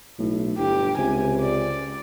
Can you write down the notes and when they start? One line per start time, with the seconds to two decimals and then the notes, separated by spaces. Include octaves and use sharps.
0.19 B1 A2
0.58 G1 G2 G4
0.98 C#2 C3 G#5
1.40 D5